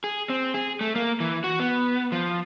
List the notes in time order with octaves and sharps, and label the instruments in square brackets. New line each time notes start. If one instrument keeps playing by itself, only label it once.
[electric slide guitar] G#4
C4
G#4
A3
A#3
E3
F#4
B3
F3